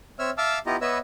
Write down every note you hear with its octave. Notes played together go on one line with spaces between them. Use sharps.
C4 C#5 E5 E6 F6
E5 F5 A5 D6 E6 F6
B3 E4 F4 G4 D#5 A#5
B3 B4 C#5 D#5 E5 E6